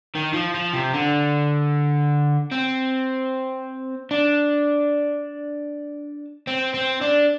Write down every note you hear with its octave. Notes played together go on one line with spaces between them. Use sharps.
D#3
F3
F3
C3
D3
C4
D4
C4
C4
D4